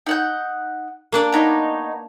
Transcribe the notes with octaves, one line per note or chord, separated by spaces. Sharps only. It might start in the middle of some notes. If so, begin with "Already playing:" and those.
D#4 F#5 G6
A#3 D4 D5
B3 D#4 C#5